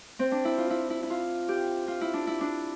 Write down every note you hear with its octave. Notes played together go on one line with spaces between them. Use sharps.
C4
D4
E4
F4
E4
E4
E4
F4
G4
F4
E4
D4
E4
D4